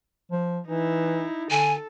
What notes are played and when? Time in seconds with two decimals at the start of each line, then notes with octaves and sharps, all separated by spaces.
0.31 F3
0.67 E3 D#4 E4
1.50 D3 A4 G#5